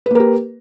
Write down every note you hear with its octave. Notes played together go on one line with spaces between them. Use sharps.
A#3 G4 A#4 B4